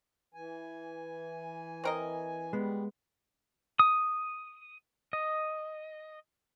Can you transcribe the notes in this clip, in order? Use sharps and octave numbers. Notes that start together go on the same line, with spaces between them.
E3 G#5
C4 A#4 D#5
G3 G#3 B3
D#6
D#5